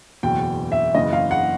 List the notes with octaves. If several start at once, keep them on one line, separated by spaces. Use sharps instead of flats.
F#1 E2 B2 G5
E5
F#1 E2 C#3 E3 D#5
F5
F#5